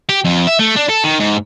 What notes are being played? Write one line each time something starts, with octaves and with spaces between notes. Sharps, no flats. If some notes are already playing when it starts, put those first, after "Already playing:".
G4
F2
E5
A3
D4
A4
D#3
G#2